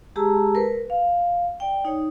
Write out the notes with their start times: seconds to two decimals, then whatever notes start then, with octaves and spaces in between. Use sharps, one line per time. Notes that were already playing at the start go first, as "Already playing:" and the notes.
0.16 G#3 G4 G#4 A5 A#5 E6
0.55 A#4 B4
0.90 F5
1.60 D5 G5
1.85 D#4 C#5